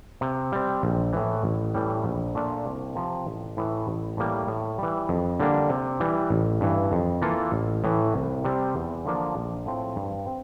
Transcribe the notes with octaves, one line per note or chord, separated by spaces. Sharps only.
C3
G3 C4
A#1
A2 E3
A1
A2 E3 G3
A#1
A#2 A3 D4 F4
C2
C3 F3
A1
A2 E3
A1
A2 E3 G3 A#3
A2
E3 G3
F2
D3 G3 A#3 D4
C3
E3 G3
A1
G2 E3
F2
E3 A#3 F4 A4
A1
A2 E3
C2
C3 G3 C4
E2
D3 F3 A#3 D4
A#1
A2 F3 C4 F4
G2
C4